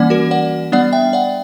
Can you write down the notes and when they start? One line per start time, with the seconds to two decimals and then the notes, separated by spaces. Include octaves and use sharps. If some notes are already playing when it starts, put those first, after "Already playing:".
Already playing: E3 G3 A#3 C#4 D5 F#5
0.10 F#4 A#4
0.31 D5 F#5
0.72 G3 B3 D4 D5 F#5
0.93 E5 G5
1.13 D5 F#5